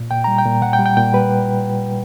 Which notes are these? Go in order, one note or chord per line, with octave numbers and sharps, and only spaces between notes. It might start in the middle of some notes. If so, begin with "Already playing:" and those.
Already playing: A#2
A#2 G5
G3 A#5
G5
A#2
A#2 F#5
G5
G3
G5
A#2 G5
G3 B4